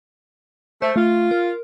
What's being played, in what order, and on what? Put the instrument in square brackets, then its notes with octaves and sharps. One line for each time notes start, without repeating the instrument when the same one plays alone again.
[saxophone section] A3 [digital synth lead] C5
[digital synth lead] A3 [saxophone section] F4
[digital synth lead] A#4